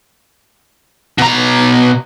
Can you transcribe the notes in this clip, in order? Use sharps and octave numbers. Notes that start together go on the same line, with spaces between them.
B2 A#5